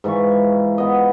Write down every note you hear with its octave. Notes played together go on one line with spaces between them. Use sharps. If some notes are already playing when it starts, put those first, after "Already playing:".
G#2 E3 F4 C#6
B3 D#5